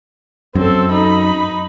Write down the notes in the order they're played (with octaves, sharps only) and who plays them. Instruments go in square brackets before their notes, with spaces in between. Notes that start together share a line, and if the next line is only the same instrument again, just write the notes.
[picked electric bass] F#2 [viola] C4 A4
[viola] D#4 B5